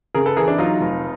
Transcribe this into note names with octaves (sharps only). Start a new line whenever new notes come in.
C#3 G#4 A#4
A4 B4
E3 G#4 A#4
D4 E4
F#3 D#4 F4
F1